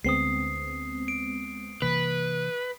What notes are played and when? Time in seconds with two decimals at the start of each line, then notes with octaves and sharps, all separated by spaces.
0.04 D2 G#3 B3 C4 D#6 C7
1.08 D7
1.82 C3 E3 A#3 B4